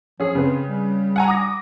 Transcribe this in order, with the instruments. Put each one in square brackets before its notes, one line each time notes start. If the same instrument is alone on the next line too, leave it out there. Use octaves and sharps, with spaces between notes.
[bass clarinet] F3 [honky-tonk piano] C#4 G#4
[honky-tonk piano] C#3 B4 [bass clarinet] C4
[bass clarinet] G3
[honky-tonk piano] F#5 G#5 A#5
D6 D#6 A#6